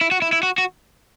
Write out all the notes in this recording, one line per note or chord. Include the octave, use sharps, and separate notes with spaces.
E4
F#4
E4
E4
F#4
F#4